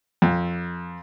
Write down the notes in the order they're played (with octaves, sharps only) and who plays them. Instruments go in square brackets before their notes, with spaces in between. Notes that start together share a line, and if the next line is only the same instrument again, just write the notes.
[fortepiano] F2